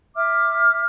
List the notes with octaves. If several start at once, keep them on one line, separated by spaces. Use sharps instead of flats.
E5 D6 F6